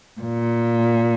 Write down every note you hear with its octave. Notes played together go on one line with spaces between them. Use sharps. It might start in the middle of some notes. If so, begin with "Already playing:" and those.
A#2